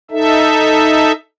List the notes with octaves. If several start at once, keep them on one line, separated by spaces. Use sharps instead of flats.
D#4 A4 E5